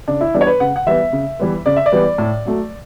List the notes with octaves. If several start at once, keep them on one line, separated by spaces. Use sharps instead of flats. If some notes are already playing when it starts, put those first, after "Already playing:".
C#3 D4
E4
E3 G3 B3 D4
C#5
B4
C#3 F#5
F#5
E3 G3 B3 E5
C#3
E3 G3 B3
C#3 D5
E5
D5
E3 G3 B3
A2
F#3 A3